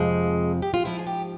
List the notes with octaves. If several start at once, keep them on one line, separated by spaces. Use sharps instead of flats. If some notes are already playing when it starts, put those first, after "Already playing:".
Already playing: F2 C3 F3 G#3
G4
F4
G#2 F3 E4
G#4
G4